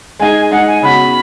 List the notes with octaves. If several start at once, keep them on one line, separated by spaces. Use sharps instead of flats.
G#3 D#4 G#4 G#5
G#3 D#4 G#4 F#5
G#5
C#3 B3 F#4 B5